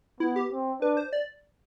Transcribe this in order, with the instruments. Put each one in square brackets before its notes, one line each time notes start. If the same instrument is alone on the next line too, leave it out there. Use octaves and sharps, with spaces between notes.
[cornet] B3 [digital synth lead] E4
[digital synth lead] G4
[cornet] C4
[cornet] D4 [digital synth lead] B4
[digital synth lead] C5
D5